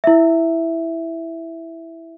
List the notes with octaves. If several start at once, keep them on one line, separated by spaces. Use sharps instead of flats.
E4 E5